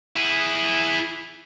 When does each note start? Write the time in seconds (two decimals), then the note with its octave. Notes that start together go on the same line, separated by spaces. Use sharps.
0.16 E4 G#4